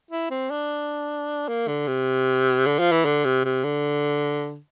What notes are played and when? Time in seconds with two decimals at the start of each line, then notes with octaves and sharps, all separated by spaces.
0.11 E4
0.30 C4
0.51 D4
1.48 A#3
1.68 D3
1.87 C3
2.66 D3
2.79 F3
2.92 E3
3.05 D3
3.25 C3
3.45 C3
3.64 D3